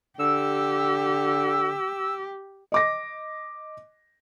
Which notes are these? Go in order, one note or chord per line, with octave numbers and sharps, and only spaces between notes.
D3 G4 E6
D#5 D6 A#6